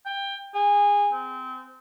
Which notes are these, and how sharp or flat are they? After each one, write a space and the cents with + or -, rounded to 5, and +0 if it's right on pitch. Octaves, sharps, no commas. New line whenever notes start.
G5 +20
G#4 -20
C4 -25